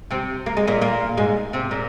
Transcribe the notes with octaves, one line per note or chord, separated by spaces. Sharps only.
C3 C4
A#3
G#3
A#2 A#3
A#2 A#3
G#2 G#3
C3 C4
A#2 A#3